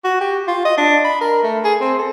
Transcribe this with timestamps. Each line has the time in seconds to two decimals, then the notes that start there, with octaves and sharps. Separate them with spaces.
0.04 F#4
0.21 G4
0.48 F4
0.65 D#5
0.78 D4
1.05 B5
1.21 A#4
1.43 A3
1.64 G#4
1.81 C4
1.99 A4